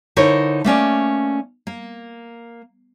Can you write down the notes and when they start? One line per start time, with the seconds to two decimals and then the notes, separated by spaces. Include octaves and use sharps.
0.16 D3 D#4 E4 A#4 C5 C#5
0.64 A3 A#3 C#4 D5
1.67 A#3